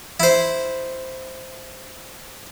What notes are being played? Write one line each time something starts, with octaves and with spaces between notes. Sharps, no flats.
E4 C5